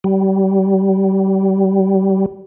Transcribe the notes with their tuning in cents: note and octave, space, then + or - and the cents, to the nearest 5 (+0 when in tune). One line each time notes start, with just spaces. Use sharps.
G3 -30